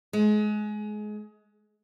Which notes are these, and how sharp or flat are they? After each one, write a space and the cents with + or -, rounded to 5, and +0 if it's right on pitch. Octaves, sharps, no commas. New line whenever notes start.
G#3 +25